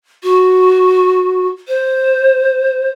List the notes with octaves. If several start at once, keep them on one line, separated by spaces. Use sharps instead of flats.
F#4
C5